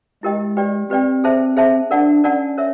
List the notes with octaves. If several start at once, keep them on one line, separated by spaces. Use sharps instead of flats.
G#3 E4 G4 A#4 D#5 G5
G4 B4 D5 G5
C4 G4 B4 D5 G5
G#4 C5 E5 A5
G#4 C5 E5 A5
D4 A#4 D5 F#5 A5
C#4 A#4 D5 F#5 A5
A#4 C#5 E5